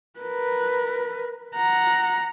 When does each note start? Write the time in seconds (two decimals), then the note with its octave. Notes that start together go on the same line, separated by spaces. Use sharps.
0.20 A#4 B4
1.56 F#5 A#5